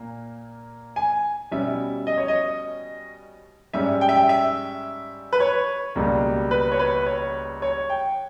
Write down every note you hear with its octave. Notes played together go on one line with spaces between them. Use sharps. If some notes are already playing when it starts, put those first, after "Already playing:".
Already playing: A#2 A#3
G#5
B2 G3 C#4 E5
D#5
C#5
D#5
G#2 G3 C#4 E5
G5
E5
G5
E5
B4
C#5
C#2 B2 G3 A#3
B4
C#5
B4
C#5
C#5
G5